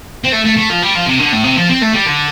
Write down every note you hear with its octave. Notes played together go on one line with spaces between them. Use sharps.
C4
A3
A3
A3
F3
G3
F3
C3
D3
A2
C3
F3
C4
A3
G3
D3